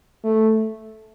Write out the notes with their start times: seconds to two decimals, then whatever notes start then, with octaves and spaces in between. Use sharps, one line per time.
0.24 A3